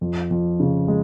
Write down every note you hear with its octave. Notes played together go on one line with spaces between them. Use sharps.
F2
F2
C#3
G#3